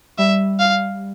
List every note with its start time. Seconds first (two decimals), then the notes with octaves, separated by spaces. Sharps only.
0.18 G3 E5
0.60 F5